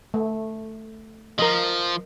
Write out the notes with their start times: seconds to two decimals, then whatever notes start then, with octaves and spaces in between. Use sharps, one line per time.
0.14 A3
1.39 F3 A#4 D#5